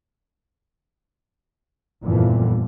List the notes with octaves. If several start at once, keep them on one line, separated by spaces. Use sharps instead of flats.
G1 F2 A#2 D3 E3 F3